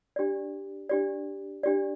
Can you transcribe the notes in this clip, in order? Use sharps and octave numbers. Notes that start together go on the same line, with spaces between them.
D4 G4 D5
D4 G4 D5
D4 G4 D5